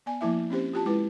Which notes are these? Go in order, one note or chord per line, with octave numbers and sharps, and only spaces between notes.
B3 D5 G#5
F3 A#3 E4 E5
C4 C#4 G4 C5
F4 G4 A5
G#3 E4 B4